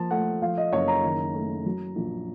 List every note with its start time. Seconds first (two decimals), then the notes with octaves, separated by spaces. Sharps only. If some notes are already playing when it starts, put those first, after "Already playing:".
Already playing: F3 A#3 A5
0.11 A3 F#5
0.42 F3 F5
0.57 D#5
0.72 F#1 C#5
0.88 A#5
1.03 D#3
1.34 A3
1.66 F#3
1.96 A#1